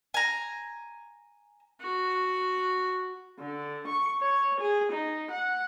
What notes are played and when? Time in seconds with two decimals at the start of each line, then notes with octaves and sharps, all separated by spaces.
0.14 G#5 A#5
1.81 F#4
3.39 D3
3.88 C#6
4.22 C#5
4.60 G#4
4.92 D#4
5.31 F#5